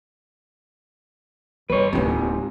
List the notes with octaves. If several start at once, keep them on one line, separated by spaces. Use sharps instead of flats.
G1 B4 C#5
D1 G#2 C3 F4